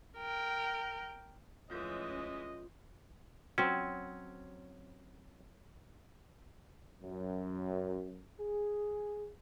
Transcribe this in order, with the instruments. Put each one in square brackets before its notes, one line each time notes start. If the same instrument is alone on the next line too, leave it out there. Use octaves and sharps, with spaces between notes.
[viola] A#4 G5
[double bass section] D2 F3 C#4 [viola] E3 G#3 [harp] F4 G6 [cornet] D#5
[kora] F#3 C4 [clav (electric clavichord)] C#4
[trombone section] F#2
G#4